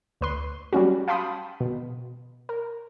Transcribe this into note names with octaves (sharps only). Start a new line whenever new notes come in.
D2 B4 C6
F#3 G3 C#4 F#4
F5 G5 A5 B5 C6 D#6
B2
A#4